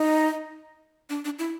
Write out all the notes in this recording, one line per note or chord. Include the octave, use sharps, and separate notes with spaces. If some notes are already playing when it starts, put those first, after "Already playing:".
Already playing: D#4
D4
D4
E4